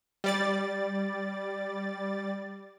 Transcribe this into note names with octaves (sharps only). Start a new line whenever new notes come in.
G3 D5 A6